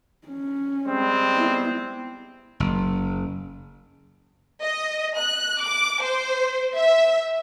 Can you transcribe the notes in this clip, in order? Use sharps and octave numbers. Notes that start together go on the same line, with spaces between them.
C#4
G3 G#3 C4
B3 E4
F#1
D#5
F#6
D6
C5
E5